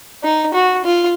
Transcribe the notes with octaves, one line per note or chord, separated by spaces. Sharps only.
D#4
F#4
F4